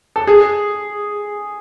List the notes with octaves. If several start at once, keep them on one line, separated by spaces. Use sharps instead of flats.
A4
G#4